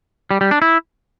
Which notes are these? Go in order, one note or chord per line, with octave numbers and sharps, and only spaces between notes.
G3
G3
D4
E4